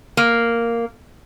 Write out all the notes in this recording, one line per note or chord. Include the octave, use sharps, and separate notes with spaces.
A#3